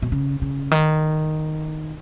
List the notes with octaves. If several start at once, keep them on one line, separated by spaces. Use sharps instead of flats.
B2
C#3
C#3
D#3